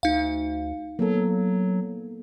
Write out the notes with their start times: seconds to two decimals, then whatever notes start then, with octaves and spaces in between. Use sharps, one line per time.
0.03 D2 D#4 F5
0.99 F#3 A#3 B3 A4